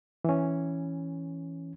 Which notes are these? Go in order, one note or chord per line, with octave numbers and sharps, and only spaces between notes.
E3 C#4